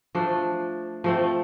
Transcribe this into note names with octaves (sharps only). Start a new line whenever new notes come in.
F3 A3 D4
F3 A3 C4